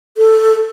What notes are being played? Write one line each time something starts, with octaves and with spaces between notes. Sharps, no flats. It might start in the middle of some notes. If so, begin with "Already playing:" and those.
A4